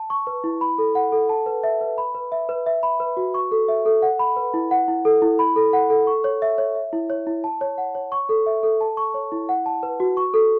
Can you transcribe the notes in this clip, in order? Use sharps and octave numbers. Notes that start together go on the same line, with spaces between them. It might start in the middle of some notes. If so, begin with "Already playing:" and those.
Already playing: A5
C#6
B4
E4
B5
A4
F#5
A4
A5
B4
E5
B4
B5
B4
E5
B4
E5
B5
B4
F#4
C#6
A4
E5
A4
F#5
B5
B4
E4
F#5
E4
A4
E4
B5
A4
F#5
A4
C#6
C#5
E5
C#5
E5
E4
C#5
E4
A5
C#5
F#5
C#5
C#6
A4
E5
A4
A5
C#6
C#5
E4
F#5
A5
B4
F#4
C#6
A4